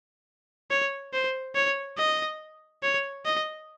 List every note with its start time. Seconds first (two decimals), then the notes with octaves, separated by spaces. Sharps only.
0.71 C#5
1.13 C5
1.55 C#5
1.98 D#5
2.83 C#5
3.26 D#5